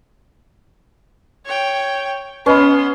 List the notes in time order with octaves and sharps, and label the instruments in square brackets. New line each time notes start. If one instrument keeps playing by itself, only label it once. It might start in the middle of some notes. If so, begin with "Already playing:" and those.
[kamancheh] C#5 G5
[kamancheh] B3 C6 [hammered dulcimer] C#4 [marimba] B4 D#5 B5